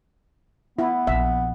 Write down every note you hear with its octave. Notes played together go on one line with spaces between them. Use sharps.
B3 E4
A#1 E5